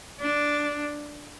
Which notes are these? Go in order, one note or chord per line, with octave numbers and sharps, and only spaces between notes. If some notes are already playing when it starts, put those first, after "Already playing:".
D4